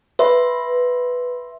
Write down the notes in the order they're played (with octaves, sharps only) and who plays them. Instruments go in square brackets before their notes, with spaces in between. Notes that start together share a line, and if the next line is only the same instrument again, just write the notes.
[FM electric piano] B4 [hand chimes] E5 C6